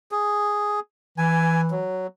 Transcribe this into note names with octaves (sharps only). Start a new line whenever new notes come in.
G#4
E3 G#5
F#3